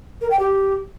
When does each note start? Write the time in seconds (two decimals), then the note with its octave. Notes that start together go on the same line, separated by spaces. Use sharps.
0.22 A#4
0.31 G5
0.39 G4